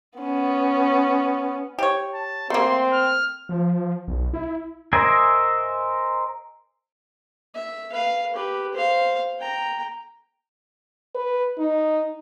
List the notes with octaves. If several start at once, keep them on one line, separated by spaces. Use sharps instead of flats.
B3 C#4
G4 C#5
A5
A3 A#3 C4 C6
F6
F3
B1
E4
A#4 C5 D#5 E5 G#5
E5
B4 F5
G4 B4
C5 F5
G5 A#5
B4
D#4